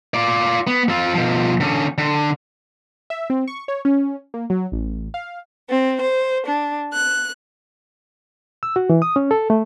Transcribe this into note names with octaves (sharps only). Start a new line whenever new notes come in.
F4 D5
B3
C4 F4
B2 F3
D3 C#4
D3
E5
C4
C#6
C#5
C#4
A#3
F#3
A1
F5
C4
C5
D4
F#6
E6
F#4
E3
D#6
C#4
A4
A3